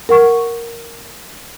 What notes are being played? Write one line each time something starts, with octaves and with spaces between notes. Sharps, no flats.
A#4 F#5 C#6